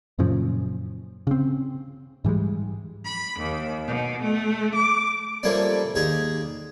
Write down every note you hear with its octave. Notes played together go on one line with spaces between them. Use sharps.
F#2 A#2 C#3 F3
C#3 C4
G#2 E3 G3 G#3
B5
D#2
B2
A3
D6
F3 G3 A3 A#3 C#4 D5
D#2 G4 G#4 D#5